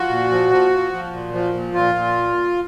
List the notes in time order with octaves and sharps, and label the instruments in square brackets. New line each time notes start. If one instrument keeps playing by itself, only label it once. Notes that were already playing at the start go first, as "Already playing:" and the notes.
Already playing: [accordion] F3 F#4
A#2
F3
F3
F3
F3
A#2
F3
A#2
A#2 F4
A#2